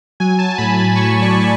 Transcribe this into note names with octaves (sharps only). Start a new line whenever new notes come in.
F#3 G#5
A5
A2 B5
B5
A2 C#6
D5
A2